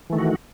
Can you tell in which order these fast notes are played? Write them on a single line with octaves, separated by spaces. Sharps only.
E3 A3 D#3 F#4